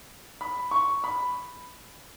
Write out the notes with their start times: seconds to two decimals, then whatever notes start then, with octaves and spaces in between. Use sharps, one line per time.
0.41 B5
0.71 C#6
1.04 B5